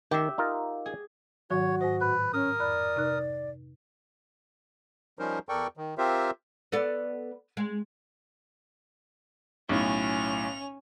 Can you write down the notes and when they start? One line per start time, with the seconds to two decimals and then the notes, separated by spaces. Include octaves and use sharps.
0.11 D#3 G4 E5
0.38 D#4 F4 A#4
0.86 G#4
1.50 G#2 D#3 F#3 F#4 C#5
1.81 G#2 C5 D#5
2.01 A2 B4
2.33 C#4 A#4 D#6
2.60 F2 D5 B5 F#6
2.96 C3 D#4 F#6
5.19 F3 G3 C#4 D#4 A#4 C5
5.49 E2 A4 A#4 D5 G5 C#6
5.77 D#3
5.98 C4 F4 G4 A#4 C5 E5
6.72 B3 A4 D5
7.57 G#3
9.69 B1 A2 C#4 F7